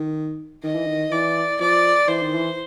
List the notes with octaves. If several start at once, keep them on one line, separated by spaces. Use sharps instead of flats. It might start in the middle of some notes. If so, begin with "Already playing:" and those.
Already playing: D#3
D#3 D#5
E3
D#3
E3 D5
F3 D5
E3 C5
D#3
E3